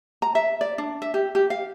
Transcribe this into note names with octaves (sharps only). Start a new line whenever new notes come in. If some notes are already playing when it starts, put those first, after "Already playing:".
A#5
E5
D5
D4
E5
G4
G4
F5